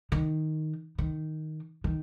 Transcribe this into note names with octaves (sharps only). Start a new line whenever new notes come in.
D#3
D#3
D#3